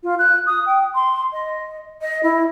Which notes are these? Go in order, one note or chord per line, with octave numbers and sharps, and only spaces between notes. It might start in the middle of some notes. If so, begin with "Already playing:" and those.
F4
F#6
D#6
G5
C6
D#5
D#5
E4